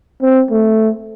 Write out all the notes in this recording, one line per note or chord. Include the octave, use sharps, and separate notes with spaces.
C4
A3